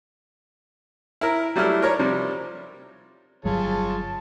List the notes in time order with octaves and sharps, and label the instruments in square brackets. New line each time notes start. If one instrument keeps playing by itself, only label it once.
[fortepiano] E4 A#4
F#3 G3 A3 E4 F6
A#4 C#5 D5
C3 F3 G3
[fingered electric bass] G1 F#3 G3 [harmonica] F4 G#4 C#5 [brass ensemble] A5